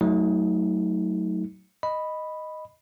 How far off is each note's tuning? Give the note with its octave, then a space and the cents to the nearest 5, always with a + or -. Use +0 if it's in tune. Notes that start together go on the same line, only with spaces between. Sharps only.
F#3 +10 A3 +0 D#4 +35
D#5 +0 B5 +0